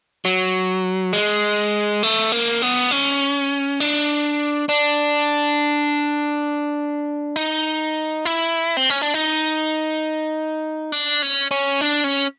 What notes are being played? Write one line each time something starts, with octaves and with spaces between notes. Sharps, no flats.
F#3
G#3
A3
A#3
B3
C#4
D4
D4
D#4
E4
C4
C#4
D4
D#4
D4
C#4
C#4
D4
C#4